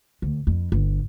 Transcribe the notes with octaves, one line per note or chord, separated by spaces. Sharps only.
D2
F2
G1